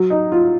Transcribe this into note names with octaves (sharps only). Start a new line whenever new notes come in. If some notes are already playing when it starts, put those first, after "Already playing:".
Already playing: F#3
D#4
F4